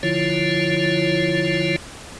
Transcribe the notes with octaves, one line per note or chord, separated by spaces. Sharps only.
D3 F3 E4 F4 C#5